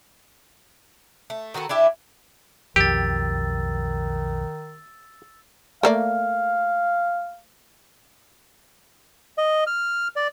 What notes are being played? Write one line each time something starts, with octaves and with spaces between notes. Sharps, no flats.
A3
D#3 F#4 A4 B4
D4 E4 G4 E5
B1 F2 D#3 G4 E6 A6
A3 A#3 D5 F5
D#5
F6
D5